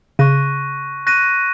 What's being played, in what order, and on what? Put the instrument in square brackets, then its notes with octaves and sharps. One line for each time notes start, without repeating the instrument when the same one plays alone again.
[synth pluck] C#3 [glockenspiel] C#6 F#6 A#6 D#7
[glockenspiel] C#6 F#6 A#6 D#7